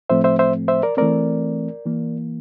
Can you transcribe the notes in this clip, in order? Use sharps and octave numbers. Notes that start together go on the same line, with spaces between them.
A2 F3 A3 C4 C5 E5
C5 E5
C5 E5
C5 E5
A#4 D5
E3 A3 C4 A#4 D5
E3 A#3